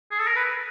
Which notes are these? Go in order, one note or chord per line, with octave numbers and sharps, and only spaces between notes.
G#4
A4
A#4
B4